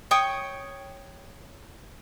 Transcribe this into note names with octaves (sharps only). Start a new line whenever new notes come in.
C#5 G5 C#6 D#6